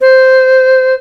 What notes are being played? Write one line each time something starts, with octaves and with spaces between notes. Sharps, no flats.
C5